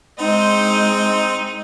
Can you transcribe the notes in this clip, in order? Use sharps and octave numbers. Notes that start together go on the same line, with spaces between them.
G#3 C4 D#4